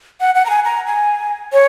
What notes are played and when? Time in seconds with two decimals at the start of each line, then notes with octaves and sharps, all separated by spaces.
0.21 F#5
0.35 F#5
0.46 A#5
0.50 G#5
0.65 A#5
0.87 G#5
1.53 C#5